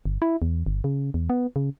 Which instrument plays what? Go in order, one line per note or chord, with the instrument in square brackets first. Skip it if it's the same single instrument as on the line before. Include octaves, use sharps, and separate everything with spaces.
[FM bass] G1
E4
E2
G1
C#3
E2
B3
C#3